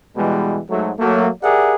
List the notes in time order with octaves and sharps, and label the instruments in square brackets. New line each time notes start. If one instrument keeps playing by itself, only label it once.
[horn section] B2 E3 G3 G#3
G#2 F#3 A3
F#3 A3 A#3
G4 G#4 A#4 D5 E5 F#5